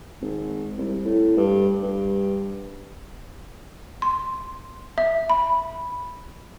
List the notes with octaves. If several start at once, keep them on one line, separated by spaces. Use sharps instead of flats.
G#1
C2
A2
G2
G2
C6
E5
B5